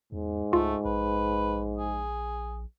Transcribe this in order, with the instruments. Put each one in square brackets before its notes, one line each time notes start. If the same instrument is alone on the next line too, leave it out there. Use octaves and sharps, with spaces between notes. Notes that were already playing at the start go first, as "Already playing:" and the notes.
[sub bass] E2 [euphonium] G#2
[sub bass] C#2 [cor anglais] A3 [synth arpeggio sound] F4
[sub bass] A#1 [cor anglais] B4
[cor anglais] G#4